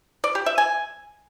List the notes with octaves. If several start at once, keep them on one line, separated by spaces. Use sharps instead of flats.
D5
G4
E5
G#5